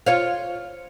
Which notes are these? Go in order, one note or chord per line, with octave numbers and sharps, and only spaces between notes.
F4 C#5 F5